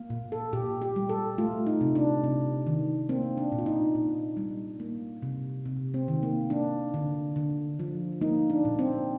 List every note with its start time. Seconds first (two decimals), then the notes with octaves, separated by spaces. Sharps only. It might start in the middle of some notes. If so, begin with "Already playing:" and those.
Already playing: A#3
0.10 A#2
0.32 A4
0.53 A#2 G4
0.82 G4
0.96 G3
1.09 A4
1.38 A3 F4
1.67 D#4
1.81 C3
1.95 D4
2.24 C3
2.67 D#3
3.09 A#3 C4
3.38 D4
3.52 A#2
3.58 F4
3.66 D#4
3.95 A#2
4.37 G3
4.80 A#3
5.22 C3
5.66 C3
5.94 C4
6.08 D#3
6.23 A#3
6.50 A#3 D4
6.94 D3
7.36 D3
7.79 F3
8.21 A#3 D#4
8.50 D4
8.65 A#2
8.79 C4